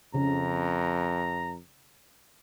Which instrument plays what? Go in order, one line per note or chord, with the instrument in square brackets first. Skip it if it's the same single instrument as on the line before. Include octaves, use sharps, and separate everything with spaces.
[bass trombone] F2 [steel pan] C#3 [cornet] A#5